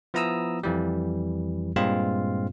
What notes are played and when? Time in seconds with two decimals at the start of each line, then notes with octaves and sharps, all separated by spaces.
0.14 F3 B3 E4 A#5 D#6 E6
0.63 F2 E3 G3
1.76 G2 A#2 G#3 C4 F4 F5